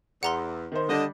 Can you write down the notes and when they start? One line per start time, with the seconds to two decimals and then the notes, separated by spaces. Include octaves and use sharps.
0.23 E2 F#5 A#5 C6
0.72 D#3 D#4 C5
0.89 D3 G3 D4 D#5